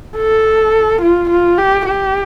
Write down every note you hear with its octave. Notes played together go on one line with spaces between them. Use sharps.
A4
F4
F4
G4
G4